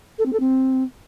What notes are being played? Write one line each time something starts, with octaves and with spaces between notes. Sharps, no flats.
A4
C4
A4
C4